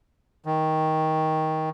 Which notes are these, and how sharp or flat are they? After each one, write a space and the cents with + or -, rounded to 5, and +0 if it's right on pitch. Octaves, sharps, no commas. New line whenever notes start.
D#3 +15